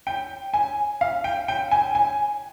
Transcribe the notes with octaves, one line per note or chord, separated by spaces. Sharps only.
G5
G#5
F5
G5
G5
G#5
G#5